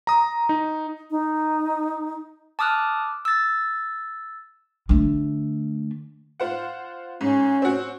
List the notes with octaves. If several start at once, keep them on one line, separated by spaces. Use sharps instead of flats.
A#5 D#6
D#4
D#4
A5 D6 D#6 F6 F#6
E6 A6
D3 A3
F4 C5 F#5
G#2 C#4
C4 F#4